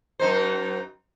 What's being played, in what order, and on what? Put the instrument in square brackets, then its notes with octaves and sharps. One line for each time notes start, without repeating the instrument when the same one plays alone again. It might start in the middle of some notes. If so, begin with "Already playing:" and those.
[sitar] F#2 D#4 C5